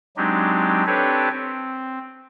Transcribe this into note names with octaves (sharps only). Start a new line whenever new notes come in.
F#3 G#3 C4 D4 D#4 G4
C4 D4 G4 A4 B4 C#5
C4